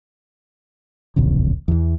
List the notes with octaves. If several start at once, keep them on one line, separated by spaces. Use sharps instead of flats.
D1 A#1 E2 C#3
E2 E3